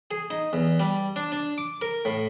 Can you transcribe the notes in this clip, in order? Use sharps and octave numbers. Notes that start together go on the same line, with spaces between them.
G#4
D#4
E2
G3
D4
D4
D6
A#4
A2